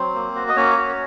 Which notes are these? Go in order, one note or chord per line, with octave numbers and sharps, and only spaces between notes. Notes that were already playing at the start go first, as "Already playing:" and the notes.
Already playing: F#3 C4 C5
A#3
F#4
D#5
A#3 C#4 C#5
F#4